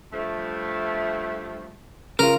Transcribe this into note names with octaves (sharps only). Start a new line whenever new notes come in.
G2 F3 A3
C#3 F4 A#4